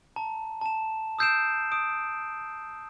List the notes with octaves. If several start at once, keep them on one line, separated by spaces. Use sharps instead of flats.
A5 A#5
A5 E7
D#6 E6 G6 C7 D7 E7
D#6 D7